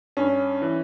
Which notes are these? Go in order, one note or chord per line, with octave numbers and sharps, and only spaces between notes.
G2 C#4
E3